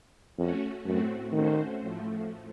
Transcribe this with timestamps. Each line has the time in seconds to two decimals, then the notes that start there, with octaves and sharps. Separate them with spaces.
0.38 F2 A3 C#4 F#4
0.85 F#2 A2 A3 C4 F#4
1.32 D#3 A3 C#4 F#4 C5
1.80 A2 F3 A3